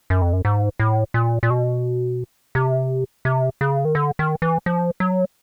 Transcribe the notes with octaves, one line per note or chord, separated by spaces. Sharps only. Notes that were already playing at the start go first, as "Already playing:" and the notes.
F#2
F2
F#2
G#2
A2
A#2
A#2
B2
C3
C3
C#3
D#3
D3
D#3
E3
F3
F#3